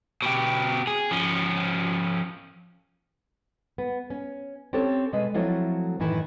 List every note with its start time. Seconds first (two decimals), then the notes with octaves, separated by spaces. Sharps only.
0.22 B2 G4
0.87 G#4
1.11 F3 C#4
3.78 B3
4.10 C#4
4.73 C4 C#4 G4 A4 C#5
5.13 B2 G#3 B4 D#5
5.34 F3 F#3 A3 C4 E4 C#5
6.00 F#2 A2 D#3 E3